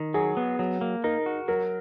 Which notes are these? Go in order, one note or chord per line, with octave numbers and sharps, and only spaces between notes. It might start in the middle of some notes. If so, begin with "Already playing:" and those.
Already playing: D#3
F#3 G#4
B3
F#3
A#3
D#4 A#4
F#4
F#3 A#4